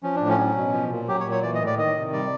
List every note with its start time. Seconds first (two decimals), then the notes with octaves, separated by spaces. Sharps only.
0.03 F3 C#4
0.16 A2 D4
0.29 C#4
0.38 F#3
0.56 B2
0.73 F3
0.91 A#2
1.08 F#3 G4
1.20 C#5
1.25 A#2
1.31 C#5
1.43 E3 D5
1.55 D#5
1.60 A2
1.67 D5
1.77 D#3 D#5
1.95 C3
2.13 G3 D5